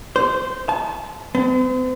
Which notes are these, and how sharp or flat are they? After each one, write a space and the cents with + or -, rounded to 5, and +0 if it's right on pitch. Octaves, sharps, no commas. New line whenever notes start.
C5 -15
A5 -35
C4 -45